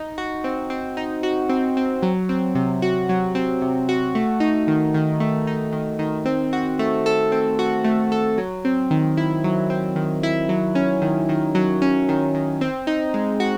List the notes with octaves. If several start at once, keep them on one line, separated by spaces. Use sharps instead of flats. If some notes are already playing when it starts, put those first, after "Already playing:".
Already playing: D#4
F#4
C4
C4
D#4
F#4
C4
C4
F#3
C4
C3
F#4
F#3
C4
C3
F#4
A3
D#4
D#3
D#3
A3
D#4
D#3
D#3
C4
F#4
A3
A4
C4
F#4
A3
A4
F#3
C4
D#3
E4
F#3
C4
D#3
E4
F#3
C#4
D#3
D#3
F#3
C#4
D#3
D#3
C4
D#4
G#3
F#4